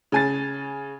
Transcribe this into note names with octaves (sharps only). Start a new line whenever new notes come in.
C#3 G#5 A6